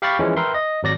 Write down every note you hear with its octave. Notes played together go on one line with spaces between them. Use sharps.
G4 F5 G5 B5 C#6 A6
E3 F3 G#3 C#4 E4
A#4 B4 E5 G5 C6
D#5
G#1 F#3 D5 A#6